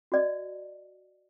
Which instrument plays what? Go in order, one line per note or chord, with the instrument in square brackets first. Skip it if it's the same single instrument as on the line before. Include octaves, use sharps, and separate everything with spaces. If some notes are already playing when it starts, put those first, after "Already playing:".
[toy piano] F#4 D5 D#5